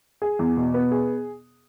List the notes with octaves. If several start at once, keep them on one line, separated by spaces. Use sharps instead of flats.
G#4
E2
B2
B3
G#4